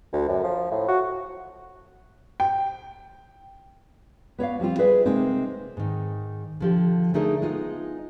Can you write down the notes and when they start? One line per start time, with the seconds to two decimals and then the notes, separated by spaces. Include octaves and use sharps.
0.13 D2
0.29 F#2
0.44 F3
0.71 A2
0.88 F#4
2.40 G5
4.38 B3 C#5 D5 F5
4.60 F3 G3 C4 F4
4.79 G#4 B4 D5 E5
5.05 C3 G#3 A#3 C4 D#4
5.77 G#2 D#3
6.61 D3 F3 G4
7.14 D3 A3 D#4 G#4 A#4
7.42 G#3 B3 D#4 F4